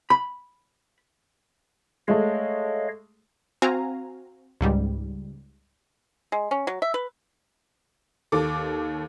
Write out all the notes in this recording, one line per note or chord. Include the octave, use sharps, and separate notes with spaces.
B5
G#3 A3 C#5 D#5 F5
C4 F#4 F5 G#5 A#5
C#2 G#2 G3
G#3
C#4
F#3
E5
B4
D#2 A4 D6